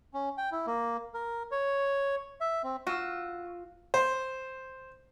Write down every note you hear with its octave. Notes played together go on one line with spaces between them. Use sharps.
C#4
G5
E4
A#3
A#4
C#5
E5
C4
F4 F#4 E6
C5